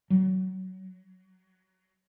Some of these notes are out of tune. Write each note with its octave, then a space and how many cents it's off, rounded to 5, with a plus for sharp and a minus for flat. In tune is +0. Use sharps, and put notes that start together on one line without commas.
F#3 +20